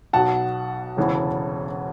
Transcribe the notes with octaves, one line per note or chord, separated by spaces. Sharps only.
B1 B2 F#5 A5
E1 D2 C#3 E3